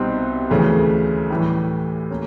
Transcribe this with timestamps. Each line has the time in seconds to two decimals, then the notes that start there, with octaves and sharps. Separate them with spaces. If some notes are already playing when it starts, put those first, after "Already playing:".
Already playing: C2 B2 G3 C4 D#4
0.50 D2 C#3 E3 A3
1.30 A2 E3 G3
2.10 A#3 C#4